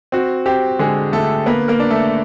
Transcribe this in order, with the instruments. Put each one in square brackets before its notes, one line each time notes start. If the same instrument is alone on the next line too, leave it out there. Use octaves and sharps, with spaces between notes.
[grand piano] C4 F#4
C4 G4
D3 G#3 G#4
D3 A3 A4
A#3 B3 B4
A#3 A#4
D4
A3 A4